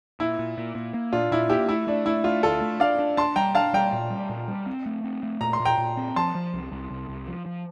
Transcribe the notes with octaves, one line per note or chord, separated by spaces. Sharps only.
A#2 E4
A#2
A#2
A#2
A#3
A#2 D4 F4
A#2 E4
A#3 E4 G4
A3 E4
A3 D4
A3 E4
A3 D4 F4
D2 F4 A4
A3
D4 D5 F5
D4
D4 A5 C6
G3 G5 A#5
D4 F5 A5
G3 G5 A#5
A#2
G3
A#2
G3
C4
A3
C4
A3
A#2 A#5
C6
A#2
G5 A#5
A#2
C4
F3 A5 C6
F3
C2
C2
C2
C2
F3
F3